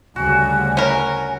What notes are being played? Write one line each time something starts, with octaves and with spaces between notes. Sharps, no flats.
D2 C#3 G3 F#4 G#5
C#4 A#4